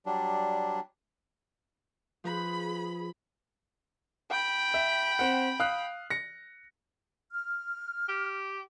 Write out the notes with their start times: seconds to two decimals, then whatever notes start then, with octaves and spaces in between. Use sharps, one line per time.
0.06 F#3 G3 D4
2.24 F3 G#4 B4 B5
4.30 G5 B5
4.74 E5
5.19 C4 F#5
5.60 F5 D#6 F#6
6.10 A#6 C#7
7.32 F6
8.09 G4